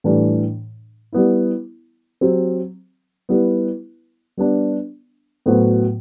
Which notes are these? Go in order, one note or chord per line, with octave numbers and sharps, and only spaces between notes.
A2 E3 G3 D4
G3 B3 E4
F#3 C4 G4
G3 B3 E4 B4
G3 B3 D4
A2 F#3 B3 F#4 C5